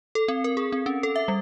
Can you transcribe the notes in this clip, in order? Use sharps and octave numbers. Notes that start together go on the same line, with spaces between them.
A4
C4
A#4
G#4
C4
C#4
A4
E5
G3